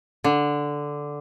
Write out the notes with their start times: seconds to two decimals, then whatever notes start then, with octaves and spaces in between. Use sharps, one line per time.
0.24 D3